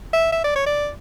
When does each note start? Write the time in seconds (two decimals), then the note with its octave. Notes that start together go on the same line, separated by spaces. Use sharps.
0.13 E5
0.32 E5
0.44 D5
0.55 C#5
0.66 D5